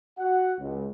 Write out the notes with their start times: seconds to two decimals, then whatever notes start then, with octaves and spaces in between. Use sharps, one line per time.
0.19 F#4 F#5
0.60 C#2